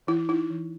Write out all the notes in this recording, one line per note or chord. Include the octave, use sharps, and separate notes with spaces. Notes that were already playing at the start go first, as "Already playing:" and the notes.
E3 E4
D#4 E4
E3